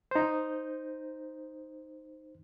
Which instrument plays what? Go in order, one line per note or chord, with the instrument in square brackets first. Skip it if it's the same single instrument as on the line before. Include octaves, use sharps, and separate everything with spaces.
[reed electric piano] D#4 C5